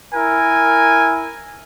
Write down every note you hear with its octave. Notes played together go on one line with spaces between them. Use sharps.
E4 A#4 G#5